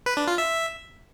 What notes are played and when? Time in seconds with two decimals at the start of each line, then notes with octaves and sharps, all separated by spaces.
0.06 B4
0.17 D4
0.28 F4
0.38 E5